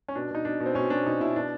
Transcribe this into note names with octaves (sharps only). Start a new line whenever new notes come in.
C#4
B2 D4
B2 D#4
B2 D4
B2
C4
B2 C#4
B2 D4
B2 D#4
B2 E4
B2 D4